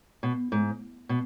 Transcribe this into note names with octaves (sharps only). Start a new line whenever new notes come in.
B2
G#2
B2